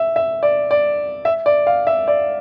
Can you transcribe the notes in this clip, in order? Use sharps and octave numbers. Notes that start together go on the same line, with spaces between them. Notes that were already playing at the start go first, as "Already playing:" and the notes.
Already playing: E5
E5
D5
D5
E5
D5
F5
E5
D5